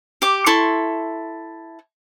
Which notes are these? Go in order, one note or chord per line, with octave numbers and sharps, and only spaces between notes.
G4 D6
E4 A4 C6 C#6